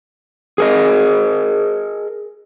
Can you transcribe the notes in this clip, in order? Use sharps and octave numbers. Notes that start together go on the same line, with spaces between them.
G#4 A#4 D#5